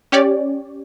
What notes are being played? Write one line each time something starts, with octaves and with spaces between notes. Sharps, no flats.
C#4 G4 C#5 D5